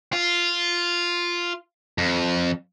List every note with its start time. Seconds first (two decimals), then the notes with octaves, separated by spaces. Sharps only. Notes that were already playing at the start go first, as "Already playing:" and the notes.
0.13 F4
1.98 F2